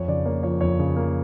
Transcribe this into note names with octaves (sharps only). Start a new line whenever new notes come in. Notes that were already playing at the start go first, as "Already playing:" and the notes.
Already playing: F2 C#5
C#3 D5
A#3 C#5
F3 C#5
F2 C#5
C#3
A#3